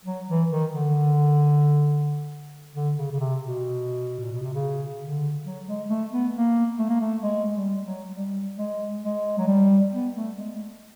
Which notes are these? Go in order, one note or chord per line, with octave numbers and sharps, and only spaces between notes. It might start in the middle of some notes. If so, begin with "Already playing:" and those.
F#3
E3
D#3
D3
D3
C#3
C#3
C3
B2
A#2
B2
C3
C#3
D3
F#3
G#3
A3
B3
A#3
A3
A#3
A3
G#3
G3
F#3
G3
G#3
G#3
F#3
G3
B3
A3
G#3